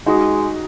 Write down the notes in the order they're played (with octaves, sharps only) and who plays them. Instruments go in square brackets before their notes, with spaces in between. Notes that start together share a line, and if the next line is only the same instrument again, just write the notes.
[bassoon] G#3 [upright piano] D#4 F#4